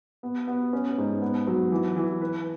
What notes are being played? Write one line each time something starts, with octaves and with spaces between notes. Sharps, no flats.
B3
B3
C#4
G#2
B3
F#3
E3
E3
B4